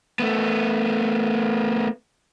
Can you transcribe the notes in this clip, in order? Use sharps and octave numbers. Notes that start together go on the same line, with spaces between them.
A3 B3